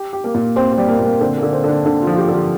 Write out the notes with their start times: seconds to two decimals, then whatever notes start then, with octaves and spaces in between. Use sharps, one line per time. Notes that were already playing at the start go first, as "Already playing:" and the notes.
Already playing: G4
0.13 G4
0.24 A#3
0.35 A#2
0.56 C4 G4
0.72 C4
0.78 G3
0.89 A#3
0.99 A#2
1.05 A#3
1.21 D3 C4
1.37 A#3
1.43 D3
1.53 C4
1.64 D3 D4
1.85 D3 D4
2.02 F4
2.07 F3
2.13 F4
2.18 G4
2.28 D3
2.34 F4